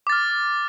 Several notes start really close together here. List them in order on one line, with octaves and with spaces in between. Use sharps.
D6 A6 F6